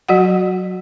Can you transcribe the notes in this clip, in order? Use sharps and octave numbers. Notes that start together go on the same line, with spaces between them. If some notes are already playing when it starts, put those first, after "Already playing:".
F#3 F#4 F#5